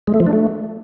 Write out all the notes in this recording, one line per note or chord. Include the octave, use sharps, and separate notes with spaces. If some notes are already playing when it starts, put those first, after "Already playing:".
G#3
A3
F3
D4
A3